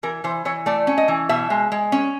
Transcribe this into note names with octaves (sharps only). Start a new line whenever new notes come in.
E3 A#4
E3 C5
E3 C#5
A3 D5
C#4
D#5
E3
B2 E5
G#3
G#3
C#4